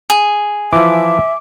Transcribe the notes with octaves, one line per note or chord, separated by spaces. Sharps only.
G#4
E3 F3 E5 D6